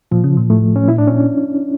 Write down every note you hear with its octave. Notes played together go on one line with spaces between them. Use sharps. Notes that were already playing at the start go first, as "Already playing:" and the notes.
A#2 F3
C#3
A#2
A2 A3
C#4
A#2 E4
A2 D4
A#2 C#4